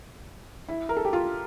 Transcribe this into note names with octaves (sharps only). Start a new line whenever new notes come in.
E4
A#4
A4
G4
F4